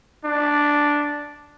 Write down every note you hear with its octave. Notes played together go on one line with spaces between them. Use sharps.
D4